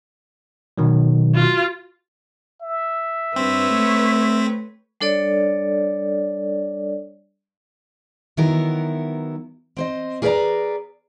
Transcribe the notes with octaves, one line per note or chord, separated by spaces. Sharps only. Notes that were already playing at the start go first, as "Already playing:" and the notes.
B2 D#3 F#3
F4 F#4
E5
G2 C4 B4 C#5
A3
G3 D4 A4 C#5 D5
D#3 F#3 B3 E4 A#4
C4 C5 D#5
G#4 A#4 B4 C#5 D5 A#5